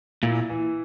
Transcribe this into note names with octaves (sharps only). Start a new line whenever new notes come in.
A#2 E4
E3